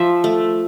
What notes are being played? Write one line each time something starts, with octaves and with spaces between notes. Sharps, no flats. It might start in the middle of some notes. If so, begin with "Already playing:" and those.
Already playing: F3 E5
A3